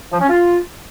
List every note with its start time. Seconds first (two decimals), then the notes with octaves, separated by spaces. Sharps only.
0.12 F3
0.21 C#4
0.29 F4